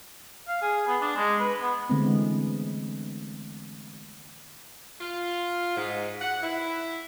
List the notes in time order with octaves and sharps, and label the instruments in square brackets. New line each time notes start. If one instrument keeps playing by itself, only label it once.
[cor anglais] F5
G#4
B3
D4
G#3
B4
B3
[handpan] D3 E3 G#3 A3 B3 C4
[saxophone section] F4
G#2
F#5
E4